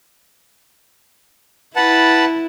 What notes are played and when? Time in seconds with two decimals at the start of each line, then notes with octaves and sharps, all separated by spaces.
1.76 E4 B4 F#5 A5